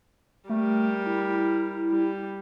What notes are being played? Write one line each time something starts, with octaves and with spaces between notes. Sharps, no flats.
G3 A3 A#4
E4
G3